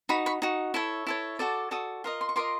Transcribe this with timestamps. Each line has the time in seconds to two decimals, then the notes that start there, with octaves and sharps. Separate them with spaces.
0.09 D#4 F#4 B5
0.26 B5 C#6
0.42 D#4 F#4
0.74 E4 A4 C#5
1.07 E4 A4 C#5
1.39 F#4 A4 D5
1.71 F#4 A4 D5 D#6
2.04 F4 A#4 D#5
2.21 C6
2.29 C#6
2.36 F4 A#4 D#5 C6 D6